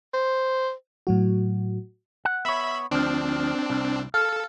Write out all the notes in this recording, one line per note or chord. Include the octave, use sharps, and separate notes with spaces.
C5
A2 F#3 F#4
F#5
B3 C#5 E5 B5
D2 F3 C4 D4
C2
A4 F5